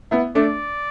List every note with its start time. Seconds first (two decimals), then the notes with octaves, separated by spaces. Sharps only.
0.11 B3 E4
0.35 A3 D4 D5